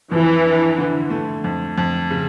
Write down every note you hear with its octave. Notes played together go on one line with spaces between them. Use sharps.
F2 E3
D4
D3
A3
F2
F2
C#3